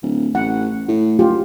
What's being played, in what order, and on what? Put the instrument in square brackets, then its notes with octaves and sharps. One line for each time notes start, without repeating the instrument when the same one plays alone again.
[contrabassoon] D1
[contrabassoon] A1 [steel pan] F#5
[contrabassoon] A2
[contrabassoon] F#1 [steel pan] F4 G4